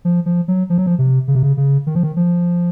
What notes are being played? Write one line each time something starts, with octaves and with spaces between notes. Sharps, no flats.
F3
F3
F#3
F3
F#3
F3
C3
C#3
C3
C#3
C#3
D#3
F3
D#3
F3